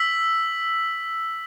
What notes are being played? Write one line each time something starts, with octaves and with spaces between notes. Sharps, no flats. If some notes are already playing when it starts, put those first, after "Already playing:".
Already playing: E6 B6 F#7